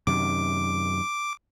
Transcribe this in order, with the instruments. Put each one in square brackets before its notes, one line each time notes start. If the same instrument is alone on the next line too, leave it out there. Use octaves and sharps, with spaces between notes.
[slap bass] F#2 C3 D#3 [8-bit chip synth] D6